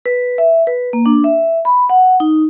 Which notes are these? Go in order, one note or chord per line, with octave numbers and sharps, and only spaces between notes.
B4
E5
B4
A#3
D4
E5
B5
F#5
D#4